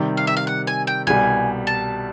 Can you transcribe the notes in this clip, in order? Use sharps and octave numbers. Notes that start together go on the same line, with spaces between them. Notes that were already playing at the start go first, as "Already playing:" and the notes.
Already playing: C3 D#3 G3
F5
E5
F5
F#5
G#5
G5
C2 B2 G3 G#5
A5